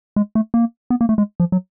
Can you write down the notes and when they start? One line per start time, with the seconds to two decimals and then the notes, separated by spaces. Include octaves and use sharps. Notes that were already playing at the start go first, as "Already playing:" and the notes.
0.16 G#3
0.35 A3
0.54 A#3
0.90 B3
1.01 A#3
1.09 A3
1.18 G#3
1.40 F3
1.52 F#3